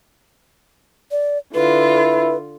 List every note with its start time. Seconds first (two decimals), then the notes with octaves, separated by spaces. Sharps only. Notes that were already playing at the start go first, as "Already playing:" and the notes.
1.11 D5
1.54 D3 E4 F4 B4